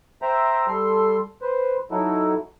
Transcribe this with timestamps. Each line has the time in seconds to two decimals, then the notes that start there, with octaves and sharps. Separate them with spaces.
0.22 C5 E5 G5 A#5
0.68 G3 A4 C6
1.42 B4 C5
1.91 F#3 D#4 E4 F#4 A4